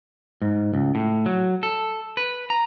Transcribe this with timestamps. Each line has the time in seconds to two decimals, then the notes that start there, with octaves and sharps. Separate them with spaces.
0.42 G#2
0.74 C#2
0.95 A2
1.26 F#3
1.63 A4
2.17 B4
2.50 A#5